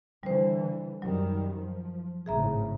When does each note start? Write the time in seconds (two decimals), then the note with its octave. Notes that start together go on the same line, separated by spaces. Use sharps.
0.23 D3 E3 G3 C5
1.02 F#2 D#3 F#3 G3
1.59 F3
2.26 G#1 A2 C#3 G#4 E5 A#5